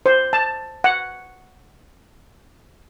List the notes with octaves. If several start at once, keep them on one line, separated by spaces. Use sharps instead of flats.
C5
A5
F#5